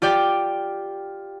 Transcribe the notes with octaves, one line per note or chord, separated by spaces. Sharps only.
F4 G4 D5 G5